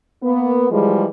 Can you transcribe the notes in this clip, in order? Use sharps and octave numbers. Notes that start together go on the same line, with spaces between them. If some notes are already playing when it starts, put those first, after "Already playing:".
A#3 B3
E3 F3 G3 G#3